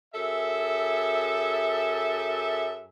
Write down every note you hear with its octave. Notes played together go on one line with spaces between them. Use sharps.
F#2 G#4 A4 E5